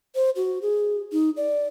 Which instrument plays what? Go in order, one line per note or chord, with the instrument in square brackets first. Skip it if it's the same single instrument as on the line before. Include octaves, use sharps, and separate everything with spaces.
[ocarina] C5
F#4
G#4
D#4
D5